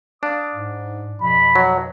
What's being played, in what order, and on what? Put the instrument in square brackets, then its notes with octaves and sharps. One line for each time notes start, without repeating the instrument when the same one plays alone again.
[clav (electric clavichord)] D4 [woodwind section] F5 D6 D#6
[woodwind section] G#2
[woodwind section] F2 B2 F3 [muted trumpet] B5
[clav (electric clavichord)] F#3